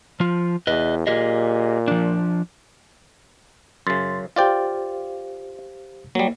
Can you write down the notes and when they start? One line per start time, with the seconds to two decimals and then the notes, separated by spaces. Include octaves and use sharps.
0.20 F3 F4
0.67 E2 B4 D#5
1.07 A#2 G4 G#4 D#5
1.88 F3 D4
3.87 F#2 C#3 C6 A6
4.36 F4 G4 C5 D5 F5 G5
6.15 F#3 G3 A#3